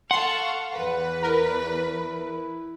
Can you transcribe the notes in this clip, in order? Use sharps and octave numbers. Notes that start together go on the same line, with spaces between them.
A4 F5 F#5 C6 C#6
E2 B4
E4 A#4